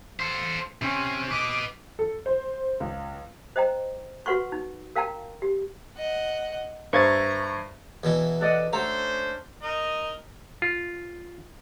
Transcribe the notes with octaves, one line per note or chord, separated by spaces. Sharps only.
A4 C5
C3 C#4
B4 D#5 D6
A4
C5
C#2
C5 D#5 G5 A#5
F#4 B4 F#5 C6 C#6
D#4
A#4 F5 G5 A5 A#5
G4
D#5 F#5
G2 C5 E5 F5 A#5 C#6 G#6 A6
E2 B2 E3
A4 D5 D#5 F#5
A3 C#4 D4 F#4 A4 C5 A#5
D#4 A#4 D#5
F4